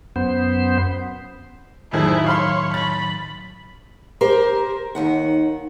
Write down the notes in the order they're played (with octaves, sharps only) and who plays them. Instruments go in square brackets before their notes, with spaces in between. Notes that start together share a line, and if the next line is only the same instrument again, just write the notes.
[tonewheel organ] F#2 B3 C5
[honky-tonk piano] F1 F2 G#4 [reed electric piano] A2 D#3 F#3 [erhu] E4
[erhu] C#5 [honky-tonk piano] F5 B5 C6
[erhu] B5 [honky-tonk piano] A6
[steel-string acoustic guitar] G4 A#4 C5
D#2 D#3 F#5